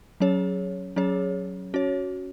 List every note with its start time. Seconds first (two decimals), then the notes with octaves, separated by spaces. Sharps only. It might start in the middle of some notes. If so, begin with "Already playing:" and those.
0.20 F#3 C#4 G#4 C#5
0.96 F#3 C#4 G#4 C#5
1.74 C#4 F#4 C#5